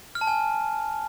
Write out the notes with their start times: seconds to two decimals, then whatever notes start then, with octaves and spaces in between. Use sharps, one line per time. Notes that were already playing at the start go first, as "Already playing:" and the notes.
0.15 F6
0.21 A5
0.27 G#5